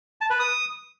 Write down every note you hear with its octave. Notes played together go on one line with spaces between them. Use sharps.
A5
B4
D#6